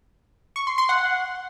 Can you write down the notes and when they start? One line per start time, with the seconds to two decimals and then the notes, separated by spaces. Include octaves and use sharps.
0.56 C#6
0.67 C6
0.78 C6
0.89 F#5